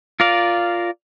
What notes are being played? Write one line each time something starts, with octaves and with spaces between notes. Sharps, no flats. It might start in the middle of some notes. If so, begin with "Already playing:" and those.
F4 A#4 D5 F5